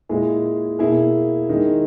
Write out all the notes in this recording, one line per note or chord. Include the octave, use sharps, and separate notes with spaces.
A#2 G#3 E4 G#4
B2 A#3 E4 G#4
D#3 G#3